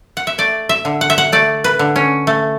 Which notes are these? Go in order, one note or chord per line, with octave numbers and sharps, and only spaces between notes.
F#5
E5
A3 D5
E5
D3
F#5
E5
F#5
A3 D5
B4
D3
C#4
A3